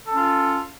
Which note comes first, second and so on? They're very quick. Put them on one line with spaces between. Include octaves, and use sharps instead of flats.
A4 C#4 F4